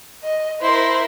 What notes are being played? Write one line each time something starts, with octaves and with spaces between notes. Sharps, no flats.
D#5
E4 A#4 C5